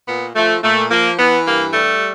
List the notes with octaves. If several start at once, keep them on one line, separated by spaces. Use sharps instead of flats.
A#2 B3
F3 A3
A#2 A3
F3 A#3
E3 B3
G2 A#3
G3 A3